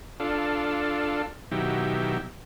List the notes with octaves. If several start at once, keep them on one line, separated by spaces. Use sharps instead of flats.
D4 F4 A4
B2 D#3 F#3 E4 G4